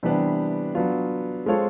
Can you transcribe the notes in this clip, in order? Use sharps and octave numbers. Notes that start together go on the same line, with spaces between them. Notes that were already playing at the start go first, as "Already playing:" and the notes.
C3 E3 G3 B3 D4
F#3 B3 D4 F4
G#3 C4 F4 A4 C#5